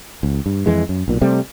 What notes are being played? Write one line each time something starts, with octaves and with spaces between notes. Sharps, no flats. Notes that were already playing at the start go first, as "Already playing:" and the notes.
C#2
G2
F2 E3 G#3
F#2
B1 A#2
C3 G3 A3 C4